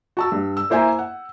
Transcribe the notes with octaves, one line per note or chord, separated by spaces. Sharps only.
F#4 A5 E6
G2
E6
A#3 E4 C5 E5 G#5 A#5
F#5